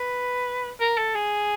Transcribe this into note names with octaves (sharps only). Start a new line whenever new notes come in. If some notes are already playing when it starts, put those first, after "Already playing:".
Already playing: B4
A#4
A4
G#4